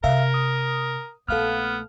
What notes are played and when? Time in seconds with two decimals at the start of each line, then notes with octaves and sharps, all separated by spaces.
0.04 C3 A#4 E5 F5
0.34 D#6
1.28 A#1 A3 B3 A4 F5 F6